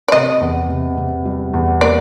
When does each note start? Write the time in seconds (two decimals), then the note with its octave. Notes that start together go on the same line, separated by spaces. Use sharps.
0.08 D5
0.12 C3 D#5
0.41 E2
0.69 C3
0.97 C3
1.25 G3
1.54 E2
1.81 A#3 D5